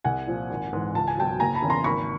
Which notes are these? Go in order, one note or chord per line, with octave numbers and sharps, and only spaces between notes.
C2 F#5 G#5
A#2 F3
G#1
G#2 E3
C#2 A5
G#5
B2 F#3 G5 A5
F#1 G#5 A#5
A5 B5
E2 C#3
A#5 C6
G#1 B5 C#6